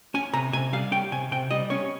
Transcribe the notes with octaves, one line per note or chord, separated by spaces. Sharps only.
C#4 G#5
C3 A#5
C3 G#5
G3 F5
C#4 G5
C3 G#5
C3 G5
G3 D#5
C#4 C#5